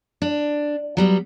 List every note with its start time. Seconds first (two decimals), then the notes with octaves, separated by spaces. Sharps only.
0.22 D4
0.97 F#3 G3 B3